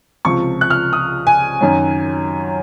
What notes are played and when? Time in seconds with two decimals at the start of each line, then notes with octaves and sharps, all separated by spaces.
0.25 C#2 C3 F3 C#6
0.61 F#6
0.70 F6
0.93 D#6
1.27 G#5
1.61 F#2 D#3 F#3